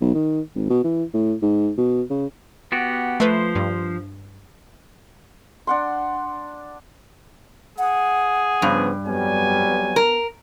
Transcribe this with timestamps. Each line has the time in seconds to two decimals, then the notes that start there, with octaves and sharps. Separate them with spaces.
0.01 B1
0.15 D#3
0.55 G#1
0.70 B2
0.84 E3
1.14 A2
1.43 G#2
1.78 B2
2.10 C#3
2.72 B3 F#4 G4
3.20 F3 A3 B4 C5
3.55 G2
5.67 D4 F#5 C6
7.78 G#4 F#5
8.62 G2 C#3 F3 B3
9.05 F2 F#3 G3 B3 G#5
9.96 A#4